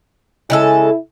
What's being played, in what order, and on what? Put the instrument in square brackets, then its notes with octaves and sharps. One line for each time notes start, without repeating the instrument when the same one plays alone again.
[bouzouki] C#3 G#3 A4 [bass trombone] E4